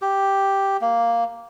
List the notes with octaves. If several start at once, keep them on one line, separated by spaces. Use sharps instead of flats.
G4
A#3